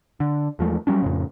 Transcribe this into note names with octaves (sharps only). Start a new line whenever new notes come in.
D3
E2 F3 G#3 A3
F#3 G3 C#4 D4
F2 A2 C#3